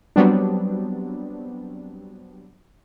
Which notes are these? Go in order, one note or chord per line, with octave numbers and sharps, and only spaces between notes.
F#3 G3 B3 C4 D4